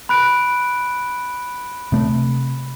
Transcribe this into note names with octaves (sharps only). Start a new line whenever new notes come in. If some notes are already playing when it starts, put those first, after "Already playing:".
B5 F#6 D7
C3 A3